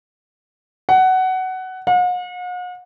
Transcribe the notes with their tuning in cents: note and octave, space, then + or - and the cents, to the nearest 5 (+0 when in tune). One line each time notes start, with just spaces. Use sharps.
F#5 +15
F#5 -45